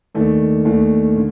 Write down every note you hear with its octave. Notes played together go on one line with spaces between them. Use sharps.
D#2 D#3 A3 D4
D#2 D#3 A3 D4
D3